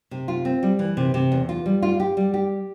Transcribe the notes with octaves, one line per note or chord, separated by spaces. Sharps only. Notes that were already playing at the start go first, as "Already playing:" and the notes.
C3
F4
C4
G3
E3
C3
C3
E2
F4
G3
F4
G4
G3
G4